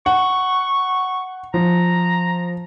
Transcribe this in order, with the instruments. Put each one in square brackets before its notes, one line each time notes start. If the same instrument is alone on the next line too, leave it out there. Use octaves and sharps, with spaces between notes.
[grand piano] F#5 [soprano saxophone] C#6
[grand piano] F3 [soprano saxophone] A#5